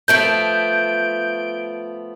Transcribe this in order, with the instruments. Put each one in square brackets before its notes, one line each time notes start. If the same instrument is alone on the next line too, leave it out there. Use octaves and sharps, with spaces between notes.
[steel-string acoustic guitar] F3 A3 B3 [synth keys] G6 D7